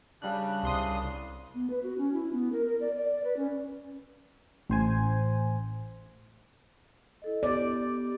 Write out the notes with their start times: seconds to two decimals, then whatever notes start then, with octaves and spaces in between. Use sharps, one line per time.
0.22 C#3 G3 D4 F#6
0.63 C2 C6 D#6
1.55 B3
1.70 B4
1.83 F#4
1.98 C#4
2.14 E4
2.33 B3
2.52 A#4
2.65 A#4
2.81 D5
2.97 D5
3.24 B4
3.37 C#4
4.70 A1 C5 G#5
7.22 E4 A4 D#5
7.43 B3 G4 D5